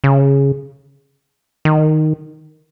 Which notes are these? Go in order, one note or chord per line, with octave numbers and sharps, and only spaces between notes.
C#3
D#3